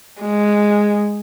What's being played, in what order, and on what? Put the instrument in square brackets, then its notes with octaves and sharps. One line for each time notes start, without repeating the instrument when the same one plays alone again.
[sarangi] G#3